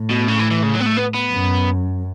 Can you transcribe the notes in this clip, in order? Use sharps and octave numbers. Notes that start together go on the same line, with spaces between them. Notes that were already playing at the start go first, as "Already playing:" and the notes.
Already playing: A2
B2
C#3
E3
E3
C#3
F#3
B3
A3
B3
B3
F#2